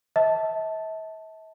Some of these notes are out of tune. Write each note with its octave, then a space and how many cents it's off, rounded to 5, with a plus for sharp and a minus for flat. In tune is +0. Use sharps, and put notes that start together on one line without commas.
E5 -40 A5 +0